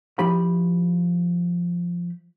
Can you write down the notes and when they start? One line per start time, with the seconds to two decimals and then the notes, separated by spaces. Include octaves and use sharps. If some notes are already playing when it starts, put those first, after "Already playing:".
0.19 F3 E4 G4 B5